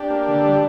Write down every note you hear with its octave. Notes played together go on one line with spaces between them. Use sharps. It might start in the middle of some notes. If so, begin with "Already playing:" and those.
Already playing: D4 G4
A#3
D3
G3
G4